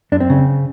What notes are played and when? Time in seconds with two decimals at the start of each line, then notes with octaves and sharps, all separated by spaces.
0.12 F#2 D4
0.20 C4
0.30 C#3